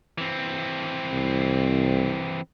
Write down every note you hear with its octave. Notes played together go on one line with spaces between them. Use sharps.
E3 C4
C2